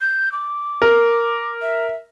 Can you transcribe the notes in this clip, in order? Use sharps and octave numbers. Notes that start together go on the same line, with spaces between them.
G6
D6
A#4
E5